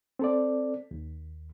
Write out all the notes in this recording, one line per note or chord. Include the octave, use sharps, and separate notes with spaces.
C4 A4 D5
D#2